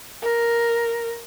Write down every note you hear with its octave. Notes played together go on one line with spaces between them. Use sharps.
A#4